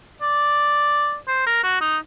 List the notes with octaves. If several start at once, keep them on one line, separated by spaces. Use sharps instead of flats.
D5
C5
A#4
F#4
D#4